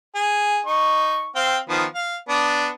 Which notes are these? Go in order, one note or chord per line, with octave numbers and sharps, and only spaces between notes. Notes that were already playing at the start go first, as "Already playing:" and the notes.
G#4
D#4 C#6
C4 F5 G5
D#3 F3 B3
F5
B3 D4